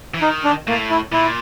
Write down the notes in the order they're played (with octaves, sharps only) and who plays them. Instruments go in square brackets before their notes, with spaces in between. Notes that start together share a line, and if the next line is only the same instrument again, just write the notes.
[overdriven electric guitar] E3
[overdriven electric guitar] D#3 [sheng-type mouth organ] D#4
[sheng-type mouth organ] D4
[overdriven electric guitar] A2 [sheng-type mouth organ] A#3
[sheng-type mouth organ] E4
[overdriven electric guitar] A#2 [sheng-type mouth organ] E4